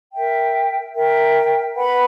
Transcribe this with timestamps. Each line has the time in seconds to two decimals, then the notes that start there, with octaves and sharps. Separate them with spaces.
0.12 A#4 E5 G5
0.94 A#4 E5 G5
1.76 B4 F#5 B5